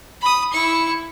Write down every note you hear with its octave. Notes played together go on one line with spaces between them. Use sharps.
B5 D#6
E4 C#6